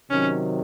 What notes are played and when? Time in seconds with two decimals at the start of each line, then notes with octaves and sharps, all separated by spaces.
0.10 C3 D#3 F#3 C#4